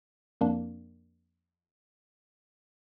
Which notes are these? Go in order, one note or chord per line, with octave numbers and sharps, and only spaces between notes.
F2 A#3 D4